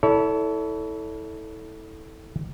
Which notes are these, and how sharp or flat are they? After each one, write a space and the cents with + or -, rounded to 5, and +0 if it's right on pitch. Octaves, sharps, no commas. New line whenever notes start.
E4 -25 A4 +0 C#5 +40